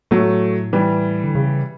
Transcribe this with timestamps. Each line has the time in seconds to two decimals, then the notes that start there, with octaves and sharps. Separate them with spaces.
0.11 A2 F#3 A3
0.73 E3 G3
1.24 D3
1.35 C#3